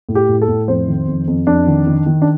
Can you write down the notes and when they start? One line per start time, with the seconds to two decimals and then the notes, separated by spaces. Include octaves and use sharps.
0.09 A2
0.15 G4
0.29 A2
0.42 A4
0.48 A2
0.68 F2 C5
0.87 D#3
1.08 F2
1.27 F2
1.47 F2 D4
1.67 D#3
1.87 D#3
2.06 D#3
2.22 D4